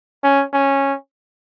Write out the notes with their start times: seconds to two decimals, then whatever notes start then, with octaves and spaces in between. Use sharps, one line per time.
0.24 C#4
0.53 C#4